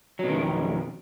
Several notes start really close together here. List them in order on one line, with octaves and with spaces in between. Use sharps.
F#3 B2 D#3 F2